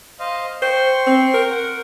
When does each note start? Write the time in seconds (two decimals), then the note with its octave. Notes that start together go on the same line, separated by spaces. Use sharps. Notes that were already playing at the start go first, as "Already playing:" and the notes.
0.19 C5 D#5 F5
0.62 C5 G5 C6 C#6
1.07 C4
1.34 A#4
1.50 F#5